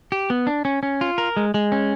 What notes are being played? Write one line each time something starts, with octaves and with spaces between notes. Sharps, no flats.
G4
B3
D4
C#4
C#4
F4
A#4
G#3
G#3
C#4